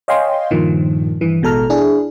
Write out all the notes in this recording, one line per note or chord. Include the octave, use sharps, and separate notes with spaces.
C#5 D#5 F5 G5 G#5 C6
G2 A#2 D#3 F3
G2 E3
A1 B2 G#3 A4 A#5 F6
D4 E4 G#4